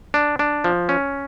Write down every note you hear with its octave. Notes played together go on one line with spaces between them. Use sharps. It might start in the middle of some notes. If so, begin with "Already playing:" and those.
D4
D4
F3
C#4